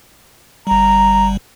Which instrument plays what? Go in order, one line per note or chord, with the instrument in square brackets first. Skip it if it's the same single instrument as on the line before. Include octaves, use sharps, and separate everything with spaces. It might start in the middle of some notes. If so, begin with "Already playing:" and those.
[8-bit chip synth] G1 G3 [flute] A#5